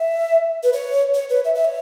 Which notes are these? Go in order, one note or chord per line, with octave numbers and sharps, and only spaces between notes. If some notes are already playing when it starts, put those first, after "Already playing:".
Already playing: E5
B4
C#5
C#5
B4
E5
E5
C#5